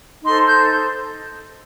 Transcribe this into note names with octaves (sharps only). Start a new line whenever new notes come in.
D#4 A4 C5 C6
G6